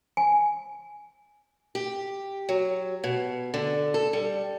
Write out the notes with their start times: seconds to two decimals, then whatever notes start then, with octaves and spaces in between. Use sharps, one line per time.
0.17 G#5
1.75 G4
2.49 F#3
3.04 B2
3.54 D3
3.94 A4
4.13 G3